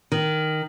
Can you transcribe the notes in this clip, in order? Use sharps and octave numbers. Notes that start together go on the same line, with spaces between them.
D#3